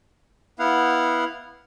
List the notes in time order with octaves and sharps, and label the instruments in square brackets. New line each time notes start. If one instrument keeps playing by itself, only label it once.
[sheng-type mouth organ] B3 E4 F5 F#5